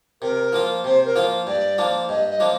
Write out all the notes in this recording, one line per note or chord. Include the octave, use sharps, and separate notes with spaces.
C3 A#4
F3 A#3 F4
C3 C5
A#4
F3 A#3 F4
G2 D5
F3 A#3 D4
G2 D#5
D#5
F3 A#3 D4